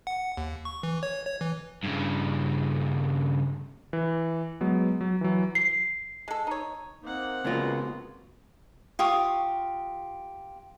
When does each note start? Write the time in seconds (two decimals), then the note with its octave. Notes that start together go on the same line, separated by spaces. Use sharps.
0.07 F#5
0.37 D#2
0.65 C#6
0.83 E3
1.03 C#5
1.26 C#5
1.41 E3
1.83 G2 C#3
3.93 E3
4.61 F#3 G#3 B3
5.01 F#3
5.21 E3 F#3
5.55 C7
6.28 G#3 A4
6.47 D#4 C#5
7.03 A#3 C4 D#4 F#5
7.44 C#3 F#3 G#3 A#3 B3 F4
8.99 F4 G4 C#6 D#6